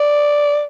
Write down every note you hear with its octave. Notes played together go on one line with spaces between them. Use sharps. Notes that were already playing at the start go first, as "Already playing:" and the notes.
Already playing: D5